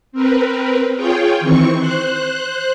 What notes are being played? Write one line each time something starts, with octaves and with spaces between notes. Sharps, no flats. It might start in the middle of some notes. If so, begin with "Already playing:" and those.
C4 A#4 B4
F4 G#4 C#5 G5
D#3 E3 C4 C#6
C5 F#6